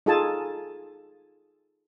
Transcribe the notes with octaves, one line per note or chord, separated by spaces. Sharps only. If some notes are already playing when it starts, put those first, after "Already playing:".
D#4 F4 G#4 A4 G#5 A5